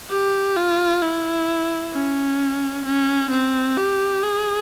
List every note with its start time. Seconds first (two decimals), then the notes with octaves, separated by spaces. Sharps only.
0.10 G4
0.57 F4
1.02 E4
1.93 C#4
2.86 C#4
3.31 C4
3.78 G4
4.23 G#4